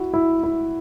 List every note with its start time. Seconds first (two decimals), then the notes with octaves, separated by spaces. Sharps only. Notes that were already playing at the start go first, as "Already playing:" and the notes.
Already playing: E4 F#4
0.14 E4
0.43 E4